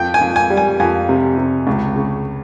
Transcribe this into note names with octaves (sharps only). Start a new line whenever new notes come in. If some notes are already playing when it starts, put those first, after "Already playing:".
Already playing: F2 G5
G#5
F2
G#5
G3
G#5
F2 G#5
C3
C3
C#2
C#3